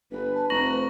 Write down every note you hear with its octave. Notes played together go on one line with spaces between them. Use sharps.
G1 B4
A5
F1 A#5 C#6 A#6 F#7
C5